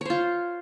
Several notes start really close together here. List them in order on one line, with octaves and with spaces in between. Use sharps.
C#5 C5 F4